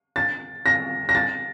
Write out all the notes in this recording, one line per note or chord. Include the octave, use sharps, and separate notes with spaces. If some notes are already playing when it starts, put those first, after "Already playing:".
A6
A#6
A#6
A6